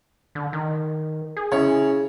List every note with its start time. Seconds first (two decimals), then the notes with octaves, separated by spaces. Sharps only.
0.35 D3
0.53 D#3
1.37 G#4
1.52 C#3 E4 C#5